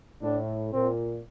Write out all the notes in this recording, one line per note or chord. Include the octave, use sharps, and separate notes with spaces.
A2 D4
A#2 C4